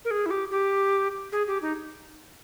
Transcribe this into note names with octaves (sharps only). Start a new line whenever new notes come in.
A#4
G#4
E4
G4
G4
G#4
G4
D#4